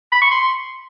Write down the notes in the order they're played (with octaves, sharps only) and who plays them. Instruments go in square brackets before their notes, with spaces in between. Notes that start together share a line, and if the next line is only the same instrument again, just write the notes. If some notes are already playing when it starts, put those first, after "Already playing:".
[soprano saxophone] B5
C#6
C6